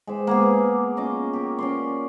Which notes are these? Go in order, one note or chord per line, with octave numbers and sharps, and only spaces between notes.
G#3 G4 C5
A#3 B3 G#4
C#4 F4 D#5 D6
G4 A#4
C#4 D5 C6